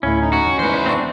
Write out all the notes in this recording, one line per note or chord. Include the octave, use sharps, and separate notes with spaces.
D2 A2 A3 C#4 E4
D#4
C#4 F#4
E2
E2 E3 G#3 B4 C5
C4 D4 C#6 G6 A#6